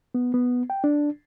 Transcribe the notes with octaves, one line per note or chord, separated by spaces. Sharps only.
B3
B3
G5
D4